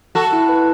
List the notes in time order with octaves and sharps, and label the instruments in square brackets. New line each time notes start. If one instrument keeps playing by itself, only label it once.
[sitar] F#4 A4 [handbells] A5
[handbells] E4
B4